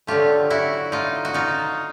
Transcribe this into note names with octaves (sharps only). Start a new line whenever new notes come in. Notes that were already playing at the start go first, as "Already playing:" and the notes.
D3 F#3 A3 F4 G4
E4 F#4
D#4 F4
F#4
D#4 F4